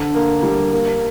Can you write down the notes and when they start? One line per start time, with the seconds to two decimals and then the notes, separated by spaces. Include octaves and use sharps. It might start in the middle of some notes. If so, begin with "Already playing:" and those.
Already playing: D3
0.15 A#3
0.43 G3
0.72 A#3